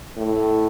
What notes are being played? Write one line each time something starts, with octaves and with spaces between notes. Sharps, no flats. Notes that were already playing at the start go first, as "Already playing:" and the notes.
A2